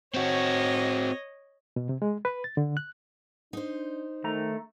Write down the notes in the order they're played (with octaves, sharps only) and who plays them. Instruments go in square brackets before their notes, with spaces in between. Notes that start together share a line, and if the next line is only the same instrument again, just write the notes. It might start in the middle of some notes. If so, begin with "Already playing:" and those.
[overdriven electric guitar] C4 F#4 [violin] C#5 D#5
[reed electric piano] B2
C3
G#3
B4
A6
D3
F#6
[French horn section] D4 [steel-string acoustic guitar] D#4 C5
[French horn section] D#3 [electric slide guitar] A3 A#5